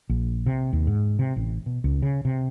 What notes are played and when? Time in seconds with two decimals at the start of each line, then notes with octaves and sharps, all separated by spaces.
0.09 A#1
0.46 C3
0.73 D#2
0.87 G#2
1.19 C3
1.36 A1
1.66 B2
1.84 C#2
2.02 C#3
2.25 C3